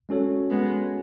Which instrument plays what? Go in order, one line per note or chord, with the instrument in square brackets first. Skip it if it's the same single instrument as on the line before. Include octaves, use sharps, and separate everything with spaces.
[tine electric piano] G#3 C#4 F#4 A4 C#5
[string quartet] G#3 B3